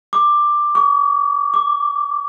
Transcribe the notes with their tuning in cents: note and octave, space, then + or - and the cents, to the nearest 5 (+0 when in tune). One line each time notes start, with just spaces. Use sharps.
D6 +10
C#6 +45
D6 +0